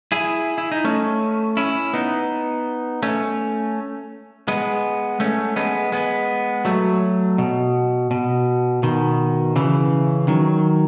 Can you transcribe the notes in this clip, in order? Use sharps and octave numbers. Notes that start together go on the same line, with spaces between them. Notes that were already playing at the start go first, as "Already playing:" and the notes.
E4 G#4
E4
D#4
A3 C#4
C#4 E4
B3 D#4
A3 C#4
G#3 B3
A3 C#4
G#3 B3
G#3 B3
F#3 A3
B2
B2
B2 D#3
C#3 E3
D#3 F#3